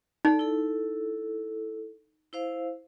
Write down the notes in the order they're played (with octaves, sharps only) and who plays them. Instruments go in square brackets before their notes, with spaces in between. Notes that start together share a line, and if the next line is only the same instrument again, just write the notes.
[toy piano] D#4 [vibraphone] A4 D5
[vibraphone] E4 A4
E4 C5 F5